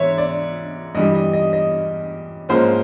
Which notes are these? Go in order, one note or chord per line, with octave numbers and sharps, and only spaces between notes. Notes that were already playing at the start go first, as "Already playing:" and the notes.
Already playing: G#2 E3 C#5 E5
D5
G2 E3 G3 D#5
D#5
D#5
D#5
G#2 F3 A#3 C#4 C5